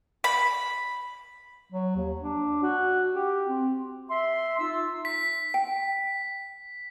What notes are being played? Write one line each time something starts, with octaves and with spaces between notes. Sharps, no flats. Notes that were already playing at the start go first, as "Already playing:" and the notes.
B5
F#3
D#2
D4
F#4
G4
C4
E5 C6
D#4 F4 E5 E6
B6
G5